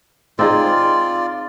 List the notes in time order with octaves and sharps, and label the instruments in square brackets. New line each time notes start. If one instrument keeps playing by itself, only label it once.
[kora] C4 D#4 G#4 [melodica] F4 D5